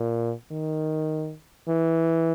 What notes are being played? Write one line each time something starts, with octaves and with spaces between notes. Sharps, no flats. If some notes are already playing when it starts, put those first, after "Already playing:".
Already playing: A#2
D#3
E3